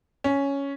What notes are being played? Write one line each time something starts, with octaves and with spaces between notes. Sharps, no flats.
C#4